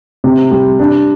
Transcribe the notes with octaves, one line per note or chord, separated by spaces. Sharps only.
C3
G3
D4